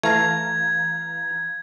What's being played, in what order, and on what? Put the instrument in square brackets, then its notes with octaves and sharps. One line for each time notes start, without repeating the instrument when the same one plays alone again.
[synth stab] E3 F5 A#5 [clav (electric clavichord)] A3 [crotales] G#6